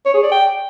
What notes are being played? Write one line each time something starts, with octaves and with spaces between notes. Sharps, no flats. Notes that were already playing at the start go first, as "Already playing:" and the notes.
C#5
G#4
D5
G5